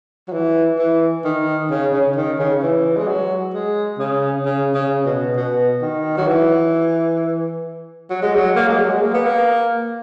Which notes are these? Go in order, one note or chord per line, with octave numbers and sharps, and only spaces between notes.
F#3
E3
E3
D#3
C#3
C#3
D#3
C#3
E3
G#3
F#3
G#3
C#3
C#3
C#3
B2
B2
D#3
F#3
E3
F#3
G#3
F#3
A#3
G#3
F#3
G#3
A#3
B3
A#3